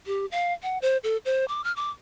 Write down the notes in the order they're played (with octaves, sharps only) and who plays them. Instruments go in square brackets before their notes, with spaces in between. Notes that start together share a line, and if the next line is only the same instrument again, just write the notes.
[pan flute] G4
F5
F#5
C5
A4
C5
D6
F6
D6